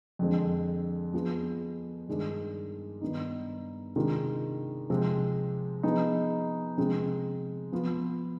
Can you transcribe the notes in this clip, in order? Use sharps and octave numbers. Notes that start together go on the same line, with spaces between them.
F2 D3 G#3 C4
F3 B3 F4 G#4
G2 D#3 G#3 D4
G2 D#3 B3 D#4
C3 D#3 G#3 D4 F4
C3 F3 G#3 C4
F3 B3 D#4 G#4
C3 F3 G#3 C4
F3 B3 F4